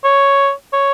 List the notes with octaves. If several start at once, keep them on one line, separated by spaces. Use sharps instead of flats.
C#5
C#5